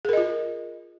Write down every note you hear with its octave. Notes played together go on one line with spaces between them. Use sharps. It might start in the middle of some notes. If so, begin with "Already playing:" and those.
F4 G#4 A#4 D#5